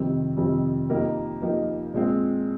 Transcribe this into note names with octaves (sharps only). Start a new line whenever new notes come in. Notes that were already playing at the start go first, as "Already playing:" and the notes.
Already playing: F2 C3 D#3 G3 C4
F2 C3 D#3 G3 C4
F3 A#3 D#4 G4 A#4
F3 A#3 D#4 G4 A#4
A#2 G#3 C4